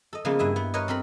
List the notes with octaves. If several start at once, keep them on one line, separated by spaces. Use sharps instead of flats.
A4 D#5
C#3 F3 G#3 A#3 B3
G2 E4 E5 G#5
B3
A#4 B4 C#5 D#5
C4 A4 A#4 B5